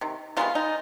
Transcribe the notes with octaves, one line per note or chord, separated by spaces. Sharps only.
C3 D#3
C3 D#3 G#3 B3 F4
D#4